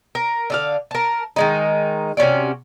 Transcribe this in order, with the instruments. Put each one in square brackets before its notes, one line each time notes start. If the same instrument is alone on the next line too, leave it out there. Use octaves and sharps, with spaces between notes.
[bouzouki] A#4
D3 D5 F5
A#4 A5
D#3 G#3 D#4
C3 C#4 F#4 D5